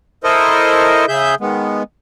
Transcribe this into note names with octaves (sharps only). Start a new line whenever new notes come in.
E4 A4 A#4 C5 D#5
C#3 G#4 E5 G6
D#3 G#3 B3